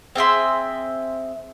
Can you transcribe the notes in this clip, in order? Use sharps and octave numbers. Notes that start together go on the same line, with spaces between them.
C4 G#4 E5 C6